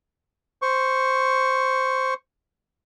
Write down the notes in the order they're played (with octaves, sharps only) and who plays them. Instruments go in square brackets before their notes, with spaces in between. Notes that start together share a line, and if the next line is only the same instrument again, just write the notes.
[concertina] C5 C#6